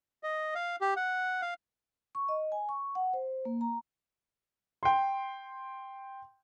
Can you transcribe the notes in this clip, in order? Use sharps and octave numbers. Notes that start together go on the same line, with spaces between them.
D#5
F5
G4
F#5
F5
C#6
D#5
G#5
C#6
F#5
C5
A#3
A#5
G5 C6